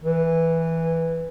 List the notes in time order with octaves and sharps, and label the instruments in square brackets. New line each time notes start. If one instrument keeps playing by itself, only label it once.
[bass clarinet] E3